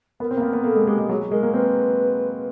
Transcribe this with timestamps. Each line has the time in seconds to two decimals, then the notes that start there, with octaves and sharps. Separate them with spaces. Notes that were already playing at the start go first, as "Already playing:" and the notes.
0.20 B3 A#4
0.31 C4
0.37 A#3
0.42 B3
0.53 B3
0.64 A#3 A4
0.75 G#3
0.86 G#3 G4
0.99 G#3
1.09 F#3 G#4
1.32 G#3 A#4
1.43 A#3
1.54 C4 B4